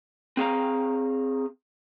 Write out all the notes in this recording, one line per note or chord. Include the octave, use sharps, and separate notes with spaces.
C4 G#4 F5 A#5